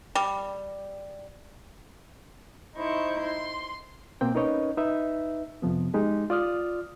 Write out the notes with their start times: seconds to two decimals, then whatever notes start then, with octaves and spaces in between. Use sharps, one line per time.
0.15 G3
2.76 D#4 E4 C5 C#6 G6
3.22 C6
4.21 B2 A#3 C4 G5
4.34 C#4 D#4 A#4 B4 C#5 D#5
4.77 D#4 B4 E5
5.62 F2 C3 F3 B3
5.94 G#3 D#4 G4
6.30 F4 D5 D#6 F6